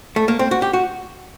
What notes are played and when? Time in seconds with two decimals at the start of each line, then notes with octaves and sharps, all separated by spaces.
0.16 A3
0.28 A#3
0.39 C4
0.51 F#4
0.62 G4
0.73 F#4